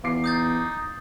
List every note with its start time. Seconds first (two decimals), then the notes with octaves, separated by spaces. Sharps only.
0.04 E2 F5 D6 C7
0.24 D#4 D#6 G6 A6